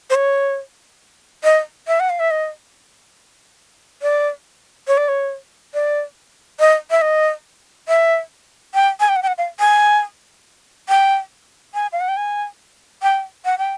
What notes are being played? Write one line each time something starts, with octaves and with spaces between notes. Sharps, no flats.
C5
C#5
D#5
E5
F#5
F5
E5
D#5
D5
C#5
D5
C#5
D5
D#5
E5
D#5
E5
G5
G#5
G5
F#5
G5
F#5
F5
G#5
G5
G#5
F5
F#5
G5
G#5
G5
F#5
G5